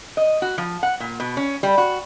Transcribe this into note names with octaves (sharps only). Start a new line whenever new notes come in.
D#5
F#4
F3
F#5
A#2
B2
C#4
G3
F#4